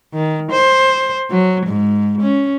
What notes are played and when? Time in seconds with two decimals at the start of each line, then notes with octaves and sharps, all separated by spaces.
0.14 D#3
0.51 C5
1.30 F#3
1.67 G#2
2.21 C#4